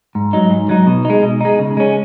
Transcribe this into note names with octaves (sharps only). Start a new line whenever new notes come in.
G#2
F#3 D#4
G#2
F#3 D#4
B2
G#3 D#4
B2
G#3 D#4
C#3
G#3 C#4